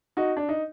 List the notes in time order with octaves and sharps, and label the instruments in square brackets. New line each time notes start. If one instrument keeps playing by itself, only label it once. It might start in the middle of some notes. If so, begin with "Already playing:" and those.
[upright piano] D#4 F#4
D4
D#4